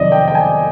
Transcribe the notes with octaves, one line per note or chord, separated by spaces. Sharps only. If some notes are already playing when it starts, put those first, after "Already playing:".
Already playing: F2 C3 D#3 F#3 D5 D#5
G5
G5
G#5